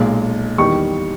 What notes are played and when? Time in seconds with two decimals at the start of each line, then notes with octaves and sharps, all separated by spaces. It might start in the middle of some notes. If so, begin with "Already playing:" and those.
Already playing: B1 A#2 G#3
0.58 E2 D#3 G3 C#6